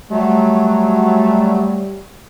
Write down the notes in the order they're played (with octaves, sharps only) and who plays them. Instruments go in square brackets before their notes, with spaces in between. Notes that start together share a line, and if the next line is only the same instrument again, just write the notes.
[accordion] F#3 [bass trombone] G3 [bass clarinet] A3